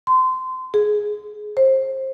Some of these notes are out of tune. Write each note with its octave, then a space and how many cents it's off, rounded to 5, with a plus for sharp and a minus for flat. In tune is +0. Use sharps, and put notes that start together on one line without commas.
C6 -25
G#4 +15
C5 +25